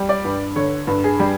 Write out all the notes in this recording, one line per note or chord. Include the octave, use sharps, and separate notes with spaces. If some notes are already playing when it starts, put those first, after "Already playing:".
Already playing: G3
D5
G2
D3 C#5
G2
G#4
G3